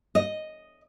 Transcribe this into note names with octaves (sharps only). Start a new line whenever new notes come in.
D#5